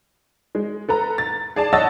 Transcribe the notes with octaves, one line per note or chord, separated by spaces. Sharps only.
G#3
A4 B4 A#5
A6
G#4 D5 A5
C#5 D#5 F#5 A5 E6 A6